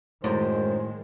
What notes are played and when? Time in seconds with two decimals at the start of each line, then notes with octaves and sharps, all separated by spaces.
0.24 F#2 A2 D#3 G#3 C5